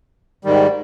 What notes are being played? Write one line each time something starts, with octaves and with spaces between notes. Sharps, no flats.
G#2 D#3 G3